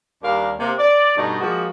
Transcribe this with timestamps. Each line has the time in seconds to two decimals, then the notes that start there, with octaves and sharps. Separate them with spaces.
0.22 D#2 G3 D4 A#4 F5
0.58 C3 A#3
0.78 D5
1.17 G2 B2 A3 D#4
1.40 F3 G#3 A#3 F#4